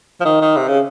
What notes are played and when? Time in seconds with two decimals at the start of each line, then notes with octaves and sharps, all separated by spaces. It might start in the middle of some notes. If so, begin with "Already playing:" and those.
0.21 F3
0.25 D#3
0.41 D#3
0.57 C3
0.68 C#3